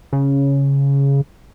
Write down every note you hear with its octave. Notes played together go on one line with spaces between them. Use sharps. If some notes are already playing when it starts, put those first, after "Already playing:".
C#3